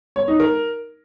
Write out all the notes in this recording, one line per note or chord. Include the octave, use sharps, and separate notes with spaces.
C#5
D#4
A#4